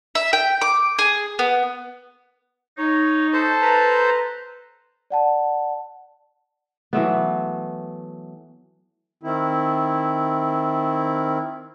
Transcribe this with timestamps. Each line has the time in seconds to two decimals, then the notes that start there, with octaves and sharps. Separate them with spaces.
0.15 E5
0.33 G5
0.61 D6
0.99 G#4
1.39 B3
2.78 D#4 C#5
3.33 A4 C5 A5
3.61 B4 A#5
5.10 D5 F#5 A5
6.93 E3 F#3 A3 B3
9.23 D#3 C4 E4